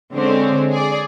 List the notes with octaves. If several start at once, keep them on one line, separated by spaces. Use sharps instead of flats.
D3 G#3 C4 C#4
G#4 D5